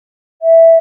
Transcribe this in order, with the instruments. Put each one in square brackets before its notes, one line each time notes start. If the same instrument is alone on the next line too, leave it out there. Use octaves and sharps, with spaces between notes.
[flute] E5